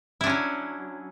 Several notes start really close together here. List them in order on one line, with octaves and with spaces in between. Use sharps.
E4 D4 C#4 F#3